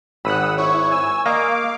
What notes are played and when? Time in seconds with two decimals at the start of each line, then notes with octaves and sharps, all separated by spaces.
0.25 G#1 F#5 B5 D#6 E6 F#6
0.58 E4 C#5 C#6
0.91 G#5 E6
1.26 A#3 D#5 F5 D6 D7